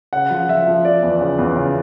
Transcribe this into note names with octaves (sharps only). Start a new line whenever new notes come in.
C#3 F#5
F3
F3 E5
F3
F3 D5
E2
C#3
E2
C#3